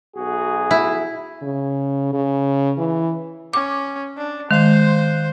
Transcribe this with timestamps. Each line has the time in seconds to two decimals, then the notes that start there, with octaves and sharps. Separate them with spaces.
0.16 B1 F#4 G#4
0.71 E4
1.42 C#3
2.13 C#3
2.78 E3
3.53 C#4 D6
4.17 D4
4.51 D#3 G#3 C5 F5 F#6